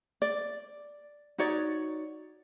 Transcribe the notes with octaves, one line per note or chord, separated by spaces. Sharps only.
D5
D#4 F#4 C#5 D5